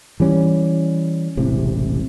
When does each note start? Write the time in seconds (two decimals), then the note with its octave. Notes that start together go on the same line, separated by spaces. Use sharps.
0.20 E3 G3 C#4
1.37 E1 A1 C3